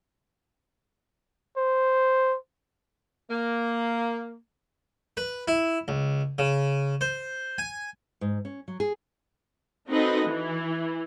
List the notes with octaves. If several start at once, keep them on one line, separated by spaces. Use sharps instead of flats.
C5
A#3
B4
E4
C#2
C#3
C5
G#5
G#2
C#4
F#3
G#4
C4 D#4 F#4 A4 B4 D#5
E3